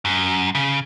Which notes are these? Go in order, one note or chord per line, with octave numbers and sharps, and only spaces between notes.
F#2
C#3